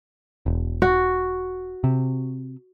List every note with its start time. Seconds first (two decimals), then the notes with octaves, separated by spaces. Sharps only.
0.46 E1
0.82 F#4
1.84 C3